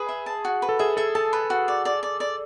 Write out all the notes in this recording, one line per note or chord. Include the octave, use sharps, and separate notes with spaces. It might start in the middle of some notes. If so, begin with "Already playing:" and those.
Already playing: G#4 B4
E5
A5
F#4
B4
A4
G#4 E5
A4 E5
A4 A5
B4
F#4
D5
D5
D5
D5